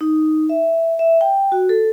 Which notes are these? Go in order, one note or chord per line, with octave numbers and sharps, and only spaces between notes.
D#4
E5
E5
G5
F#4
A4